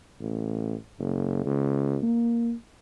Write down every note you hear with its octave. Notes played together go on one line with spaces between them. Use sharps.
A1
F#1
C#2
A#3